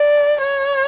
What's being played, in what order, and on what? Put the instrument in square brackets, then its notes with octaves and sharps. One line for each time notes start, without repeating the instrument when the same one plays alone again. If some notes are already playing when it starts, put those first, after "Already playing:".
Already playing: [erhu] D5
C#5